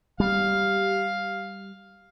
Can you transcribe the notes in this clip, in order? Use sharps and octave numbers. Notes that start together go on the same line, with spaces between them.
G3 F5